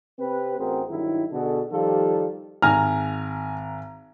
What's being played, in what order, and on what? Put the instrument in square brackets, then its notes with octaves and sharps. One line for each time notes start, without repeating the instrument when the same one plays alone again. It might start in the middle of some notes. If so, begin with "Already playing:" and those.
[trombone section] C3 C4 G4 B4
A1 C4 F#4 G#4 A#4 C5
G2 D#3 F#3 E4
B2 D3 F#4 G#4 A4
D#3 F3 G3 F4 G4 A4
[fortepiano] G#1 A#5 [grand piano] G#5 F6